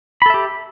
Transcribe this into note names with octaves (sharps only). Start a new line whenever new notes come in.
G4 A4 E5 B5